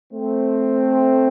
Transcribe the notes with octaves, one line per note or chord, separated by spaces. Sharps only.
A3 C4